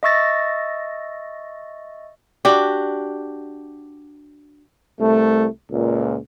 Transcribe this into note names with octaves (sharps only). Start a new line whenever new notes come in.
D#5 E5 C#6 E6 A6 A#6
D4 F#4 G4
C2 A3
C#2 A#2